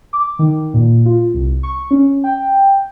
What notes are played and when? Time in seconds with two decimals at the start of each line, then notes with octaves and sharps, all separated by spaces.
0.13 D6
0.39 D#3
0.74 A#2
1.05 F4
1.34 C2
1.63 C#6
1.91 C#4
2.24 G5